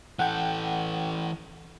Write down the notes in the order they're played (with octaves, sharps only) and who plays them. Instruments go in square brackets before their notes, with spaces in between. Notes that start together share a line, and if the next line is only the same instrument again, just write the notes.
[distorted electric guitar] E3 A4 [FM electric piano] F#5 G5